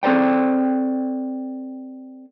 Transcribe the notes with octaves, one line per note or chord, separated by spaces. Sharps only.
C4 A4 C5 D5 G5